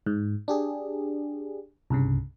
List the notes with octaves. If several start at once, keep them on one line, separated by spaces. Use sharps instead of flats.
G#2
D4 G4 G#4
C2 G2 C#3